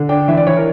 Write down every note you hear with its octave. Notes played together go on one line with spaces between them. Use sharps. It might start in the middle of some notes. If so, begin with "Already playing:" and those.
Already playing: D3
D4 G5
E3 E5
D5
E3 C#5
A#4